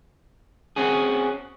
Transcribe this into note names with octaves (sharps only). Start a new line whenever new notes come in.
C4 C#4 F#4 G#4